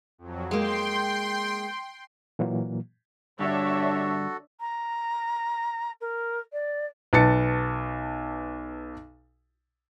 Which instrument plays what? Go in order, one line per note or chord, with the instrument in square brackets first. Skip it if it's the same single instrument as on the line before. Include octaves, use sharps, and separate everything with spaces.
[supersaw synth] F2 F#3
[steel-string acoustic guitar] G#3 A#3 [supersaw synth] G5 C6
[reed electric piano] A#2 E3 F#3 A#3
[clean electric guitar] G2 D3 G4 [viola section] D4 C#5 E5 [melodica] F#4 A4
[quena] A#5
A#4
D5
[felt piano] B1 B4 A5 A6 C#7